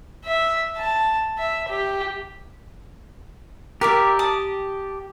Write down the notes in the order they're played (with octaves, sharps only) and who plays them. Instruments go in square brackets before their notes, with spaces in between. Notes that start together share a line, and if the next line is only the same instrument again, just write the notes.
[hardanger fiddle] E5
A5
E5
G4
[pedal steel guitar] G4 [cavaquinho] A#4 D5 E5
[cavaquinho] A5 D#6